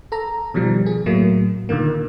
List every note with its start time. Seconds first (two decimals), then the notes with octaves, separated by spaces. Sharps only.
0.12 A4 A#5
0.54 B2 D#3 F3 G3
0.86 G#4
1.06 A2 F#3 A3 A#3
1.69 A#2 D3 D#3 A#3